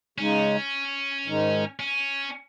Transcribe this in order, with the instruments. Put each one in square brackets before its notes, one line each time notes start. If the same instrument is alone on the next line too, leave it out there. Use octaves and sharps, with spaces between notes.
[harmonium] C#3 G#3 D#4 [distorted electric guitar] C#4
[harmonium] G#2 D#3 G#3 D#4
[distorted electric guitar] C#4